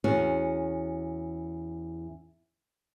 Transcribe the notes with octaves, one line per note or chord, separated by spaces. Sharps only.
E2 C#4 F#4